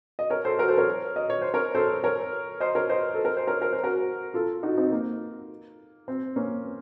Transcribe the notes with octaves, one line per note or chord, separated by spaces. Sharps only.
D#5
A#4 C#5
A4 C5
F#4 A#4
A4 C5
A#4 C#5
D#5
C#5
C5
A#4 C#5
A4 C5
A#4 C#5
C5 D#5
A#4 C#5
C5 D#5
A4
A#4
C5
A#4 C#5
A#4
C5
F#4 A#4
F4 A4
D#4 F#4
C4 D#4
A#3
C4
A#3 C#4